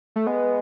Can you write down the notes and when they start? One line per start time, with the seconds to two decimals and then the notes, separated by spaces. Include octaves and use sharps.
0.16 A3
0.27 G#3 B3